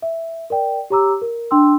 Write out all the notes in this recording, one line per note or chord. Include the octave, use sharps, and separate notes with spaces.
E5
A#4 D5 G5
G4 C#5 A#5 D6 E6
A#4
D4 G5 C6 E6